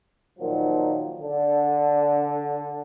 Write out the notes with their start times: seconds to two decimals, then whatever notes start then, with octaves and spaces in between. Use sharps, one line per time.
0.39 A#2 D#3 F3 F#3
1.20 D3